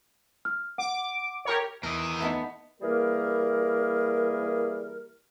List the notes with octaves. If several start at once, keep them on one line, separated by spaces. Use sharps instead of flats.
F6
F#5 D6
G4 A#4 C#5
E2 E3 A#4 D#5
A3 B3 D#4
E3 G3 A#3 G#4 A#4